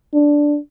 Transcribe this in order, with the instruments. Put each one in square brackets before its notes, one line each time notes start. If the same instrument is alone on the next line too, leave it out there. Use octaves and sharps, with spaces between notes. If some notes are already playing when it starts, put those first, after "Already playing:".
[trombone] D4